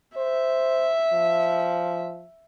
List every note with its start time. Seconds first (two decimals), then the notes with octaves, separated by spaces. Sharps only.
0.17 C5 E5
1.13 F3